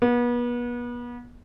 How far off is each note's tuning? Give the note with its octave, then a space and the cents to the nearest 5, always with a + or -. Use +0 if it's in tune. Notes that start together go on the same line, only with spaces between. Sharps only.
B3 -35